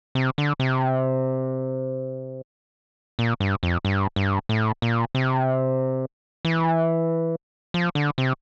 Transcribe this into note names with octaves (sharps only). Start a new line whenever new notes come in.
C3
D3
C3
A#2
G2
F2
G2
G2
A2
A#2
C3
E3
F3
D3
C3